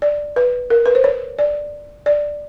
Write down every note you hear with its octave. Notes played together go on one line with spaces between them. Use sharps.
D5
B4
A#4
B4
C5
C#5
D5
D5